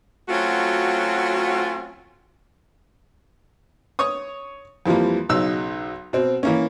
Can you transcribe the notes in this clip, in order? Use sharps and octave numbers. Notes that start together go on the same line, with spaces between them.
F#3 A3 C4 C#4 F4 F#4
C#5 C#6 D#6
F2 E3 F3 G3 A#3
B1 C#3 F#3 D#4 E6
B2 C4
E3 A#3 C#4